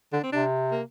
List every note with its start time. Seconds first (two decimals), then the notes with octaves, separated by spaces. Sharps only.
0.13 D3 D4
0.24 C4
0.32 C3 D4
0.71 A#3